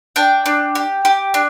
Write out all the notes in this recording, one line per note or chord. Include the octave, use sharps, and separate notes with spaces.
D4 G5
D4
G4
G4
D4